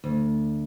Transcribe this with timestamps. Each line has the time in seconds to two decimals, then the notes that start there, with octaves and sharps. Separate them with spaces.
0.04 D2